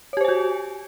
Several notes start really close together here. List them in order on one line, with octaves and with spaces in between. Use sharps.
C#5 G4 C5 G#5 F#4